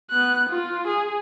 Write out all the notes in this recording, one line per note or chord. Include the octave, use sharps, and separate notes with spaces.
B3 F#6
F4
G#4